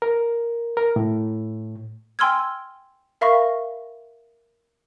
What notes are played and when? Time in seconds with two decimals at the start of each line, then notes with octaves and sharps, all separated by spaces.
0.02 A#4
0.77 A#4
0.96 A2
2.19 G5 G#5 C6 E6 F6 G#6
3.21 A#4 E5 F5 B5 C#6 A#6